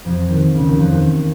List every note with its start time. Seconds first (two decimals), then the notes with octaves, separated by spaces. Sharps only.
0.05 F2 F3
0.29 D#2 D#3
0.54 C#2 C#3
0.65 D#2 D#3
0.78 F2 F3
0.90 D#2 D#3